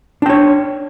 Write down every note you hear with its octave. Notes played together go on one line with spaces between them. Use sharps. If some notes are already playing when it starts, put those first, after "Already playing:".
D4 C#5 G5